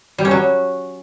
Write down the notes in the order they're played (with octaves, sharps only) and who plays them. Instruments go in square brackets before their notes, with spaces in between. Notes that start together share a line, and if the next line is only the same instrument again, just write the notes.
[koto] G3
C#4
F#3